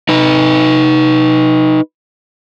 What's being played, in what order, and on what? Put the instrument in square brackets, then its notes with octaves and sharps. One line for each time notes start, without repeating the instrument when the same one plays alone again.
[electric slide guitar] D#4 B4